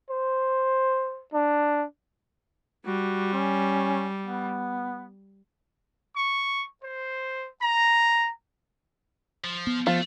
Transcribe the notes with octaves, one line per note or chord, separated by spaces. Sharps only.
C5
D4
G3 F#4
C#4
B3
C#6
C5
A#5
F3
B3
F3 A3 F4